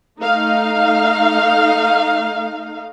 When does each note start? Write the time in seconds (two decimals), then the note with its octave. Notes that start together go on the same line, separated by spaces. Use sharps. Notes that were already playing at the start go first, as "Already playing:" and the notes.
0.20 A3 D#4 F5